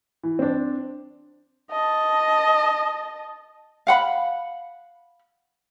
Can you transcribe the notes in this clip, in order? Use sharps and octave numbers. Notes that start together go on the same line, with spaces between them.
E3
C4 D4
D#5 A5
F5 F#5 B5